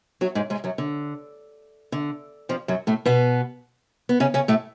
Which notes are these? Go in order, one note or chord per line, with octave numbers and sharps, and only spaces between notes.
F#3 F#4
G#2 G#3
G#2 G#3
F#2 F#3
D3
D3
F2 F3
F#2 F#3
A2 A3
B2 B3
B3
C#3 C#4
C#3 C#4
A2 A3